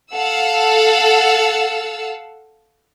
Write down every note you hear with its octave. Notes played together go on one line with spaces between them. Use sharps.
A4 F5 F#5 E6